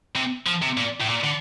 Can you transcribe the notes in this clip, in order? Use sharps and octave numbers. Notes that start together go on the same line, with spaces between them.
C3
F3
C3
A#2
A2
A#2
D3